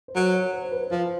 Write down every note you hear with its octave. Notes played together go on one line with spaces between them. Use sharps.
C5
F#3 C#5
C#5
C5
B4
F3 C5